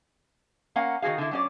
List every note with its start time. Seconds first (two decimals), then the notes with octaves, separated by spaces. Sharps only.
0.76 A#3 C#4 A#4 F5 F#5
1.02 D#3 G#3 F#4 G#4 F5
1.18 D3 E4
1.31 F#3 C#4 D5